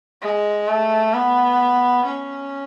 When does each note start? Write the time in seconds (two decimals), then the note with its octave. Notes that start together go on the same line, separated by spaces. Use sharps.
0.22 G#3
0.68 A3
1.14 B3
2.05 C#4